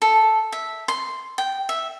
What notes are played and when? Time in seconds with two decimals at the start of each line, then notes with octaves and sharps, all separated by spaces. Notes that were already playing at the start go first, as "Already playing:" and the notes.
0.02 A4
0.52 E5
0.88 C6
1.38 G5
1.69 E5